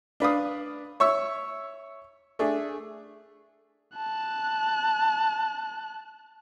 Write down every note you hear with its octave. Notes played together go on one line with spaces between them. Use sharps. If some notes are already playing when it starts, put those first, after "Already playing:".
D4 B4 F5 D#6
C#5 E5 C#6 E6
A3 D4 G#4
A5 F#6